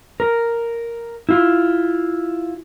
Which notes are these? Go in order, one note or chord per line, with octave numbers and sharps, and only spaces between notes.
A#4
E4 F4